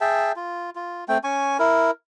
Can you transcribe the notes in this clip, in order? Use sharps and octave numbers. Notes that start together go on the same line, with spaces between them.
G#4 E5 G5 A5
F4
F4
A3 C4 G5
C#4 G#5 C#6
E4 A#4